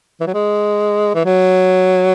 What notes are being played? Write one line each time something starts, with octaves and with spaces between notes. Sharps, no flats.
E3
F#3
G#3
E3
F#3